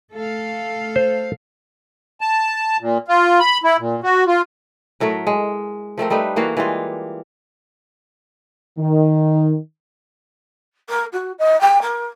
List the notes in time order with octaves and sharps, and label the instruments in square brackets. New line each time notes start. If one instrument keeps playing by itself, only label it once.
[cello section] A3 A4 F5
[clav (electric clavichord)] C5
[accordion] A5
A#2
F4
B5
E4
A#2
F#4
F4
[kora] A2 F#3 A3 A#4
G#3
F3 A3 C4 A#4
G3 A3 D#4 B4
E3 A#3 F#4 F5
E3 G3 G#3 F4
[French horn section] D#3
[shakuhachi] A#4
F#4
D#5
G5
A#4